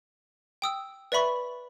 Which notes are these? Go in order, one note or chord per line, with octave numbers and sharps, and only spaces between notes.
G5 D#6 E6
B4 D5 E5 B5 C#6